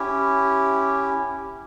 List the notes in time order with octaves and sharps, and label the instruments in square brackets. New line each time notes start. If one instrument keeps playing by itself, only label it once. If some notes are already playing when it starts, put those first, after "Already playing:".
Already playing: [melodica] C#4 E4 G4